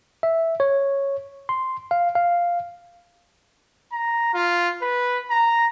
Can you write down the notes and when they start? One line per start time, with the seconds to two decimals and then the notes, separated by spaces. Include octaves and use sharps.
0.23 E5
0.60 C#5
1.49 C6
1.91 F5
2.15 F5
3.92 A#5
4.34 F4
4.82 B4
5.30 A#5